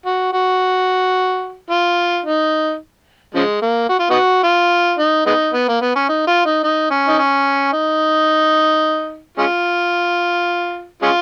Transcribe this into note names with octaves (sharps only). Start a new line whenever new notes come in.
F#4
F#4
F4
D#4
C#3 F3 G#3
A#3
F#4
F4
B3 D#4 F#4
F4
D#4
G#3 B3 D#4
B3
A#3
B3
C#4
D#4
F4
D#4
D#4
C#4
D#4
C#4
D#4
G#3 C#4 F4
G#3 C#4 F4